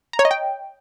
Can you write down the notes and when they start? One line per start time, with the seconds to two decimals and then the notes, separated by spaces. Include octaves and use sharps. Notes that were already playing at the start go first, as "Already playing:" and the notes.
0.13 A#5
0.19 C#5
0.25 D#5
0.31 G5